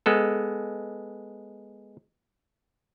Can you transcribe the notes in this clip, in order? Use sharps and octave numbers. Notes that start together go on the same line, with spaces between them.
G#3 B3 A4